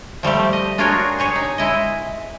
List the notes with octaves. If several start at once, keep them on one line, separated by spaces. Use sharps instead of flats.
F3 G3 A3 G4
D#5
D4 F4 F#4 G#4 A#4 C#5
G4 G#4 C#5
D#4
G#3 E4 D#5